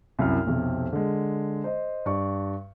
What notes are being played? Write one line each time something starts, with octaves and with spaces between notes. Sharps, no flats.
C2 F#2 E4 F6
B1 F2 C3
D3 G#3
C5 D#5
G2 D5 C#6